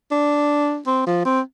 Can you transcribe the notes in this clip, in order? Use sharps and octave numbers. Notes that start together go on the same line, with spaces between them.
D4
C4
F3
C4